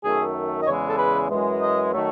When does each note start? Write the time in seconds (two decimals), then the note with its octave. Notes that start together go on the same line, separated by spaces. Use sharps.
0.04 F#2 D#3 A3 G#4
0.62 D#5
0.67 E2 C#3 E3 G#3 C#5
0.88 A4
0.98 B4
1.30 F#2 E3 G#3
1.62 D#5
1.93 D#3 F#3 A3